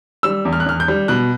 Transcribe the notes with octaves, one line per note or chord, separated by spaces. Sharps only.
G3 E6
E2
F6
F#6
E2 F6
G6
G3
B2 F#6